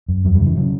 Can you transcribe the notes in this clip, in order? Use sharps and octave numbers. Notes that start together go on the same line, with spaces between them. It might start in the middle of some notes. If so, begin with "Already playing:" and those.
F#2
E2 F#3
G3
C#3
E3
C#3 F#3